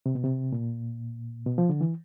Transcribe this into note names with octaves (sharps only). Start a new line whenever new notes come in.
C3
B2
C3
A#2
B2
F3
D3
E3